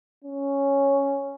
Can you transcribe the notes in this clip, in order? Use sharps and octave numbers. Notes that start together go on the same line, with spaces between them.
C#4